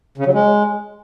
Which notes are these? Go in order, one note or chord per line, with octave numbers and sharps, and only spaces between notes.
C#3
F#3
G#3